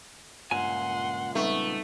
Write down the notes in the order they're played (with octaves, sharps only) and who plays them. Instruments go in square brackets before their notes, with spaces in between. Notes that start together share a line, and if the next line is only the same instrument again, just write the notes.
[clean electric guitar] C#2 A#2 G#5 [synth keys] G2 [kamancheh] F#5 C6
[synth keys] G3 C4 D#4 [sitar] A3 [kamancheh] B3